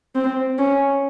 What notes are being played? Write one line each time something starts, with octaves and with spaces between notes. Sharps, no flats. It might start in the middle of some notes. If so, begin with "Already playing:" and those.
C4
C#4